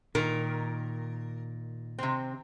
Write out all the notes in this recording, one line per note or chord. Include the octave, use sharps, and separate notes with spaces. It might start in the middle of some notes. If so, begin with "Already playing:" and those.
A#2 D#3 A#4
C3 C4